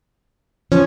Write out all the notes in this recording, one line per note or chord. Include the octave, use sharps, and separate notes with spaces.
F3 C#4